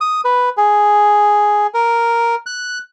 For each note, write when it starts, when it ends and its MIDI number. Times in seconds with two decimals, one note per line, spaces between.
0.01 0.21 87
0.25 0.49 71
0.57 1.67 68
1.74 2.35 70
2.46 2.78 90